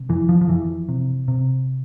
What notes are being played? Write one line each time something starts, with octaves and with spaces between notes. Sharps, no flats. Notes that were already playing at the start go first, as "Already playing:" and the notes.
Already playing: C3
F2 E3
F3
F3
F2 E3
C3
C3